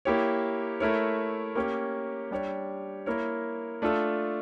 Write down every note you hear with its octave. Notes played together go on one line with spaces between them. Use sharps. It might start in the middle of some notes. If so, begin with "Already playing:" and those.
A#3 E4 G4 C#5
A3 E4 A#4 C#5
A#3 C#4 G4 C#5
G3 D4 G4 C#5
A#3 E4 A#4 C#5
A3 D4 F4 A4